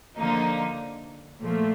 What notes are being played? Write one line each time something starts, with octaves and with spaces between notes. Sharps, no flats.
D3 F3 A#3 D#4
A#2 F3 A3